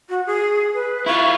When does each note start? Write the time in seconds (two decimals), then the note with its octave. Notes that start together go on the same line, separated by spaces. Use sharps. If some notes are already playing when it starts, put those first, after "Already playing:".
0.09 F#4
0.26 G#4
0.74 B4
1.06 E4 F4 C#6